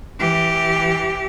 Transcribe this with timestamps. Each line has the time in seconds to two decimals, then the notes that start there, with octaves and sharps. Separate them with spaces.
0.18 E3 G4